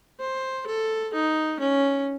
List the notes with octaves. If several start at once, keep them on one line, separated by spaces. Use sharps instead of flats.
C5
A4
D#4
C#4